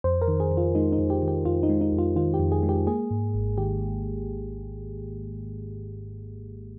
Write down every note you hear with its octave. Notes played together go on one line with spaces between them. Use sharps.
F2 C5
A#4
D#3
G#4
F2
F4
G#3 D#4
D#4
F2
G4
D#3
G4
F2 F4
D#4
G#3
D#4
F2
F4
D#3 F4
G4
F2
G#4
G#3
G4
A#3 G#4
G#2
G#1
D#3 G4